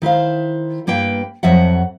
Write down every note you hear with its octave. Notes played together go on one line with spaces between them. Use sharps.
D#3 E4 C5 F5
G2 A#3 B4 G5
F2 F#3 E5 F#5